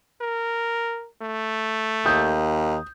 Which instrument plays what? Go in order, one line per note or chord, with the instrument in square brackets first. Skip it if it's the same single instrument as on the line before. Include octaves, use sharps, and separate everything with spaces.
[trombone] A#4
A3
[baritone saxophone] D#2 [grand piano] D#6 G6